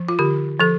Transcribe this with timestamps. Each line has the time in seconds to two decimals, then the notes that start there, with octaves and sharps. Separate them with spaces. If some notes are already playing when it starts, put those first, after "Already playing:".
Already playing: F3
0.09 F4
0.19 D3 G4
0.60 F3 A4